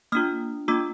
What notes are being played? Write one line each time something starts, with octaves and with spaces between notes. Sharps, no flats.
A#3 D4 F4 D#6 F6
A#3 D4 F4 D6 E6